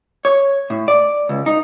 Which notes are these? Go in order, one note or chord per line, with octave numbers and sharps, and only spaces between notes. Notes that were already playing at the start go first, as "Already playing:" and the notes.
C#5
A2
D5
C#2
D#4